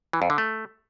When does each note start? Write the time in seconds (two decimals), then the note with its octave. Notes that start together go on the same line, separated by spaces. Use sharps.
0.13 E3
0.22 F2
0.30 D3
0.38 A3